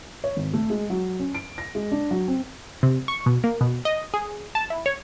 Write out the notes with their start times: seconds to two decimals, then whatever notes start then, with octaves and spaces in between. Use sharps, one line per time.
0.24 C#5
0.37 G#1
0.53 A3
0.70 G#3
0.90 F#3
1.20 C#4
1.35 D7
1.58 A#6
1.75 G#3
1.92 D4
2.11 F#3
2.28 C4
2.83 C3
3.08 C#6
3.26 B2
3.44 A#3
3.61 B2
3.85 D#5
4.14 G#4
4.55 A5
4.70 E4
4.86 C#5